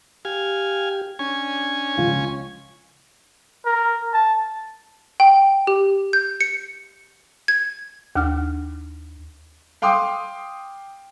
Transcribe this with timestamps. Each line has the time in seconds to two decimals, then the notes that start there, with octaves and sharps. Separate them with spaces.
0.25 G4 F5 G#5
1.19 C#4 D4 G#5
1.98 C#2 C#3 F3 F4
3.66 A#4
4.13 A5
5.20 G5
5.67 G4
6.13 G6
6.41 C#7
7.48 G#6
8.16 D#2 D4 F#5 F6
9.82 F5 G5 C6 D6 D#6